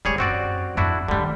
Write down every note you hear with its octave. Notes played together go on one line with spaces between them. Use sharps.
D3 G3 G#3 G#4 C#5
F#2 C4 F#4 D5
F2 D4 E4 F#4
D3 D#3 G3 A3